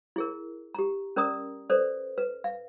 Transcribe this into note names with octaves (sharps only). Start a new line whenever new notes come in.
E4 G#4 A#4
G4 A#5
C#4 A#4 D5 A#5 D#6
A4 B4 C5 D5
B4
F5